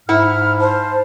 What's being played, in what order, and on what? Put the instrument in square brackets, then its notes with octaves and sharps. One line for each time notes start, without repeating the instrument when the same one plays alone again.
[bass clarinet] G#2 [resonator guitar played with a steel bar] E4 F#5 [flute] F6
[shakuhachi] C5 [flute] A5